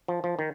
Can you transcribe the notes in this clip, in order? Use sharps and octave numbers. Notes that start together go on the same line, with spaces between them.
F3
F3
D#3